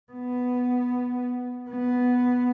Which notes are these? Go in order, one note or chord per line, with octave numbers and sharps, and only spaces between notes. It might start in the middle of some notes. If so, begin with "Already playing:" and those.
B3
B3